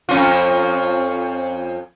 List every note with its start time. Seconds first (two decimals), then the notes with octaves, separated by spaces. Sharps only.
0.09 F2 C#4 F4